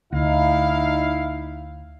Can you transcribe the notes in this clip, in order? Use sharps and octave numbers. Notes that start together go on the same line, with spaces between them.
D2 D#4 E4 F5